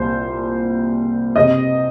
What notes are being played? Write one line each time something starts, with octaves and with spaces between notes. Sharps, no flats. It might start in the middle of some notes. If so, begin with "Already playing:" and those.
Already playing: C2 A#2 G3 C5
C3 D#5